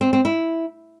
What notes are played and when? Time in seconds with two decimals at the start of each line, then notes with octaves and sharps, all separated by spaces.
0.01 C4
0.13 C4
0.25 E4